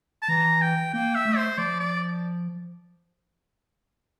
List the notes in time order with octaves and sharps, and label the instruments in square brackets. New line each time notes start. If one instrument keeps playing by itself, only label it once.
[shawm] A5
[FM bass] E3 [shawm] A#5
[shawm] G5
[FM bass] A#3 [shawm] G5
[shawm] E5
[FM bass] A3
[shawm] C5
[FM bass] F3 [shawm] D5
[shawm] D5